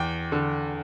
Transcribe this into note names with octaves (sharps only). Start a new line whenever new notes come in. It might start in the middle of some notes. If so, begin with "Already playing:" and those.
Already playing: E2 G5
D3